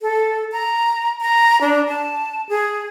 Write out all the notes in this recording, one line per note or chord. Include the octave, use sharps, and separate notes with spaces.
A4
A#5
A#5
D4
A5
G#4